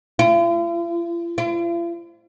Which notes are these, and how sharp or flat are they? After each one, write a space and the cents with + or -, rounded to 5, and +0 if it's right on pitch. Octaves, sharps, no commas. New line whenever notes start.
F4 -45
F4 -45